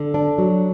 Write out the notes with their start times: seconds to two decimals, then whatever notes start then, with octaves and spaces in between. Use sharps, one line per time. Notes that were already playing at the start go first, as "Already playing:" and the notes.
Already playing: D3
0.14 D4
0.38 F#3